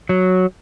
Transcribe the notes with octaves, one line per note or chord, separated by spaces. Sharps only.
F#3